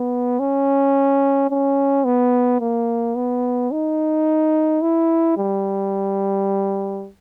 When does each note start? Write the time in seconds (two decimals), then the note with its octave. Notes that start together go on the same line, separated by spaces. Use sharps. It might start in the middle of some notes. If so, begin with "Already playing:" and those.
Already playing: B3
0.40 C#4
1.50 C#4
2.05 B3
2.60 A#3
3.16 B3
3.71 D#4
4.82 E4
5.37 G3